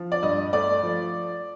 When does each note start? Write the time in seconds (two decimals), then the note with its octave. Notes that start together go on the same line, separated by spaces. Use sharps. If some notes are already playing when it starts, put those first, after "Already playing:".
Already playing: F3
0.12 D5
0.23 G2 D#5
0.53 A3 D5
0.83 F3